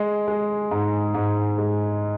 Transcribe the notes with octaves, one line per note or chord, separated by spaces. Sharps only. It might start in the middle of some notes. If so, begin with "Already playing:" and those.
Already playing: G#3
G#3
G#2
G#2
G#3